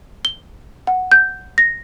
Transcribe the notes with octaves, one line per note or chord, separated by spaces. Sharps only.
G7
F#5
G6
A#6